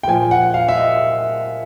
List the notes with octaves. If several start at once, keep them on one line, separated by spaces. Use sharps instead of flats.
G5
A#2 F3 G#5
F#5
F5
E5
D#5